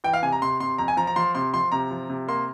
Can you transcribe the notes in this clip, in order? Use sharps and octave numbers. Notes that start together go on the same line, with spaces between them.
E3 G5
F5
C3 G#5
A#5
C3 C6
C3 C6
F2 A#5
G#5
F3 A#5
A#5
F3 C6
C3 C6
F3 C6
C3 A#5
F3
C3
A#3 C6